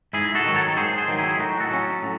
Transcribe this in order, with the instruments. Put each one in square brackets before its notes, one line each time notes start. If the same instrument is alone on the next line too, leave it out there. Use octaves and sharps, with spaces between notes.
[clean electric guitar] G#2 E4 G#4
F#4 A4
D#3 F#3
A4 C#5
A4
G#2 G#4 C5
G#4 C5
D#3 F#3
E4 G#4
A2 D#4 F#4
F#4 A4
F#3 C#4
A2